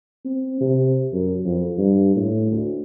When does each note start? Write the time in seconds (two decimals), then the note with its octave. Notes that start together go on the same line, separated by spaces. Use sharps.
0.25 C4
0.60 C3
1.13 F#2
1.45 F2
1.77 G2
2.16 A2
2.51 D2